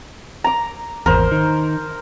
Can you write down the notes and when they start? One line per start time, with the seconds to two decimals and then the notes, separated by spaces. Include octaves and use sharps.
0.44 A#5 D6
1.06 G#1 E2 A#4 C5
1.32 D#3